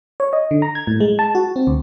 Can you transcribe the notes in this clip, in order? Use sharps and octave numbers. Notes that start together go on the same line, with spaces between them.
C#5
D#5
D3
A#5
G#6
A2
G#3
A5
F#4
C4
D2